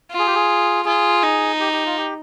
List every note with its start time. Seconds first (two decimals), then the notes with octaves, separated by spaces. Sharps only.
0.11 F4
0.19 G#4
0.27 G4
0.35 G#4
0.85 F4 G#4
1.22 D#4
1.60 G4
1.72 G4
1.85 F4
1.97 G4